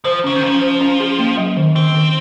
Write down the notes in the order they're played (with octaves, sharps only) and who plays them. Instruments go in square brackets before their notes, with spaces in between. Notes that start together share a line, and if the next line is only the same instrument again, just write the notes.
[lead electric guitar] F3 [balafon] C5
[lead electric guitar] C#3 [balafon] C#4
[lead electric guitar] D#3
[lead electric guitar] F3 [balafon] C#4
[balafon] C5
C#4
G#4
A#3
F#3
D#3
[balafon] D#3 [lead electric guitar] C4
[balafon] D#3